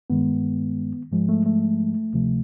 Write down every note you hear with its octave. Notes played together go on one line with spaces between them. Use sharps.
G2 D#3 G#3 B3
G#2 F3 G#3
A3
A3
D2 C3 F3 A3